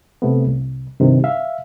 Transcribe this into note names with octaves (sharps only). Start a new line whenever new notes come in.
C3 A3 B3
C2
G2 C3 D#3
E5 F5